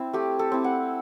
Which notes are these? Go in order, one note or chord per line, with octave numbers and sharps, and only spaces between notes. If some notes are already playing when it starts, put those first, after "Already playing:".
Already playing: C4 E4
A3 G4
A4
C4 E4
F#5